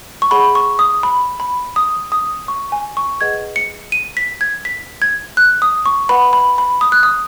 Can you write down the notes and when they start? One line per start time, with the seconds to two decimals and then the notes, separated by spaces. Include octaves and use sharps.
0.22 C#6
0.31 G#4 C#5 F#5 B5
0.55 C#6
0.79 D#6
1.03 B5
1.40 B5
1.76 D#6
2.12 D#6
2.48 C#6
2.72 G#5
2.97 C#6
3.21 G#4 B4 D#5 F#5 G#6
3.56 C#7
3.92 D#7
4.17 B6
4.41 G#6
4.65 B6
5.02 G#6
5.37 F#6
5.62 D#6
5.86 C#6
6.09 B4 F#5 B5
6.33 B5
6.58 B5
6.81 D#6
6.92 F#6
7.03 D#6